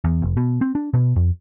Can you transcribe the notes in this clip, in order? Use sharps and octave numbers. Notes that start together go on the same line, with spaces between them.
E2
F1
B2
C4
D4
B2
F2